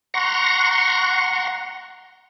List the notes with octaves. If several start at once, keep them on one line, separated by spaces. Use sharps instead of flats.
F#5 A#5 C6 C#6